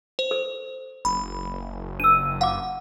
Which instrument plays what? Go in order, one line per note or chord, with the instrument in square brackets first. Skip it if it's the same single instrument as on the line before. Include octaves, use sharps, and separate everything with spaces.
[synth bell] C5
[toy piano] A4
[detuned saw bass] F#1 [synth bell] B5
[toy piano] D4 E6 [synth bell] D#7
[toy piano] F5 D6 [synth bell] F#5